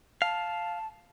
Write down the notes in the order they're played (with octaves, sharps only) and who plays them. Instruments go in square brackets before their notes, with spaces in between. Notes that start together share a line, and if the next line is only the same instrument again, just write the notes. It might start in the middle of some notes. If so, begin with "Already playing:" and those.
[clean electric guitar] F5 [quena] A5